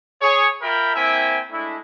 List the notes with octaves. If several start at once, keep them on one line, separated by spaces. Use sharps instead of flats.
G#4 C#5
F4 A#4 E5 G5 B5
A#3 C4 E4 E5 G5 G#5
G#3 A3 D4 E4